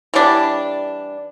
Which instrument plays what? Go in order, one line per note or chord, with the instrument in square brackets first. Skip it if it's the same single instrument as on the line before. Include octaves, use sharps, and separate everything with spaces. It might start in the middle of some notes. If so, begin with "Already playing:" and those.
[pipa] E3 G3 D4